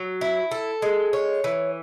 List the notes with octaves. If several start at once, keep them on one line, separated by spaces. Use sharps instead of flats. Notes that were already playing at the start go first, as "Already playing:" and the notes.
Already playing: F#3
E4
A4
G#3
C#5
E3